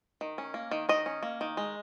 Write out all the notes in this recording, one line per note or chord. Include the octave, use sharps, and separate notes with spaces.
D#3
C#4
A#3
D#3
D#3 D#5
C#4
A#3
D#3
G#3